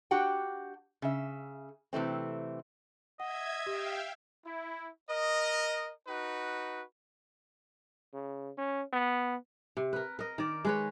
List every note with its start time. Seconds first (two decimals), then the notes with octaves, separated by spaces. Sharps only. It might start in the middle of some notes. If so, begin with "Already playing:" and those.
0.11 D4 F#4 G4 F#5 G5
1.02 C#3 E5
1.93 C3 E3 A3 C4
3.20 D#5 E5 F#5 G#6
3.66 G4 E5 F5 G5
4.46 E4
5.09 A#4 D#5
6.08 D#4 F#4 B4
8.13 C#3
8.58 C#4
8.93 B3
9.77 C3
9.93 A#4 B4
10.19 A#4 D#5
10.38 D#3 D5
10.65 G#3 B4 C#5